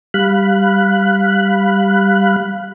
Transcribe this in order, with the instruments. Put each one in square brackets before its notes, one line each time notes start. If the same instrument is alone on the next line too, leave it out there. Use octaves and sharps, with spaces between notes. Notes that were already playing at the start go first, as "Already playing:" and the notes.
[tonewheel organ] G3 F5 B5 F#6